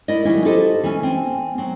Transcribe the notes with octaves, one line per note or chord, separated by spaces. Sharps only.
E4 A#4 D5 D#5
D#3 F#3 G3 C#4 E4
E4 F4 G4 A4 C5 D#5
E3 C#4
C4 G#5
F#3 C4